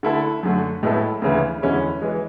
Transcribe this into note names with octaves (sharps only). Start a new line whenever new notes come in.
D3 A3 E4 A4
F#2 D3 A3
A2 G#3 B3 E4 A4
D2 C#3 E3
E2 D3 G#3 C#4 E4
E3 G#3